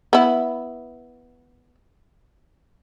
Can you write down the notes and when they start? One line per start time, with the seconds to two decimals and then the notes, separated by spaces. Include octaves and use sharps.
0.13 B3 E4